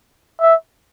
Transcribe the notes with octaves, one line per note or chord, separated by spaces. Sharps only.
E5